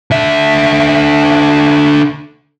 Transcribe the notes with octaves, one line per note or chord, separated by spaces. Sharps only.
D3 E5